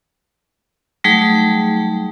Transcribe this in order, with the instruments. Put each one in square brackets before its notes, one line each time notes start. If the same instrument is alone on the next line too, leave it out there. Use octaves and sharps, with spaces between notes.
[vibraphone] F#3 G3 A3 D#4 G#4